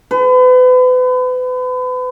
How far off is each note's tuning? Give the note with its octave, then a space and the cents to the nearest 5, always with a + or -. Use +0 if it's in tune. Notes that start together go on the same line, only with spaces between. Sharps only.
B4 +35